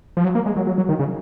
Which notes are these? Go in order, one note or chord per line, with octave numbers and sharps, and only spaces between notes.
F3
F#3
A#3
G#3
F#3
F#3
F#3
D#3
C#3